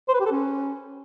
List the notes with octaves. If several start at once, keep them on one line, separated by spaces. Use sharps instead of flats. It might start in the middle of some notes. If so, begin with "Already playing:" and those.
C5
B4
G4
A4
C#4